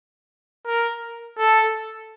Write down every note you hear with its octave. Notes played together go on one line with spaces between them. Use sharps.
A#4
A4